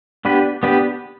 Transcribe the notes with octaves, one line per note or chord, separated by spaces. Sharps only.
B3 D4 G4 B4
B3 D4 G4 B4